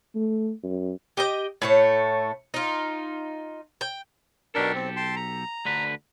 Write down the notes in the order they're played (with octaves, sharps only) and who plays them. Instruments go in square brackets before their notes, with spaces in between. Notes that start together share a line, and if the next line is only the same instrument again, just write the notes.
[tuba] A3
F#2
[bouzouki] G4 D#5 G5
A2 A3 C#5
D#4 F4
G5
[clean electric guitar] B1 G4 A4 [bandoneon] B2 D4 A#4
[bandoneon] C4
G5 A5 C6
A#5
[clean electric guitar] D2 D3 B4